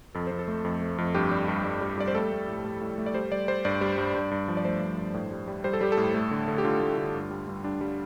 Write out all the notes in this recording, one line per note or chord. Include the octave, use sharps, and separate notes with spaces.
F2 A4
F2 C5
A4
A3
F2
A3
F2
G2 G4
G3
G2
G2
G3
G3 D5
C5
A3 A4
A3
A2
A2
A2
A3
D5
G3 C5
G3 D5
G3 C5
G2 D5
G3
G2
G2
G2
F3
D5
A3 C5
G2
G2
A2
G3
G3
G3 C5
A4
G3 G4
A4
A2
A3
D3
D3
G4
D3 F4
A3
D3
G2
G3
G2
G3 D4
G3